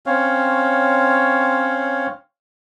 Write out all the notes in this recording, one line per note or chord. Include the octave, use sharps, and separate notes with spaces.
C4 C#4 C#5 F5